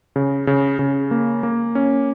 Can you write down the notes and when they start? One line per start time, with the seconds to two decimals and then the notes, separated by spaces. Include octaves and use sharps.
0.16 C#3
0.47 C#3
0.79 C#3
1.11 A#3
1.43 A#3
1.75 C#4